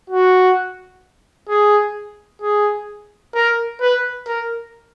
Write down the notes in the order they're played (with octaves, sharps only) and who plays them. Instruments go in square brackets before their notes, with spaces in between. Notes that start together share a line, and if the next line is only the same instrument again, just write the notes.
[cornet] F#4
G#4
G#4
A#4
B4
A#4